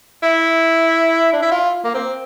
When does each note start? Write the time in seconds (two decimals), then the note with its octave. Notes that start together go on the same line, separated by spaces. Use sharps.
0.23 E4
1.33 D4
1.42 E4
1.51 F4
1.84 A#3
1.94 C4